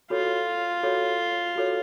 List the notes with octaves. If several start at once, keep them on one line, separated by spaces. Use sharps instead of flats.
F4 F#4 A4 C#5
F#4 A4 C#5
F#4 A4 C#5